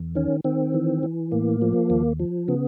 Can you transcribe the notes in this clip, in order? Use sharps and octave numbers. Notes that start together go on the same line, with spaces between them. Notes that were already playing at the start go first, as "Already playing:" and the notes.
Already playing: E2
D#3 C#4
D#3 C4
E3
E3
A2 A#3
F3
D#2
F3
C#3 B3